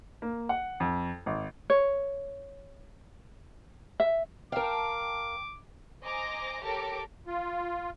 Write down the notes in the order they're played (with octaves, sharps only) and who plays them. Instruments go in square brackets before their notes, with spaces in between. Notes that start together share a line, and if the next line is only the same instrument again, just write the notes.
[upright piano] A#3
F#5
F2
G#1
[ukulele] C#5
E5
[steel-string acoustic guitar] A#4 F5 [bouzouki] G5 A5 [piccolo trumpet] D6
[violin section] C5 D#5 G#5 A#5 D6 A#6
G4 A4 A#4 C#5 A#5 D6
[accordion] F4